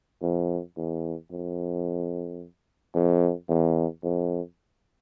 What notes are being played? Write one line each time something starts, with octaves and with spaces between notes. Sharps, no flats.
F2
E2
F2
F2
E2
F2